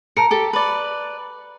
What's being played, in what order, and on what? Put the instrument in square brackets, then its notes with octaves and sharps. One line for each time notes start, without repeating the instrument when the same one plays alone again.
[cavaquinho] A#4 [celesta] A5 A#5 C#7
[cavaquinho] G4 A4
B4 D5